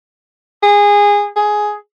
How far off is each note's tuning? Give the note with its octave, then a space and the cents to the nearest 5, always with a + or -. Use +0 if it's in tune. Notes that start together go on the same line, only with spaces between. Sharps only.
G#4 -20
G#4 +10